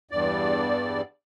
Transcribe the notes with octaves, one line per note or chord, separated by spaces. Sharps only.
E2 G2 D5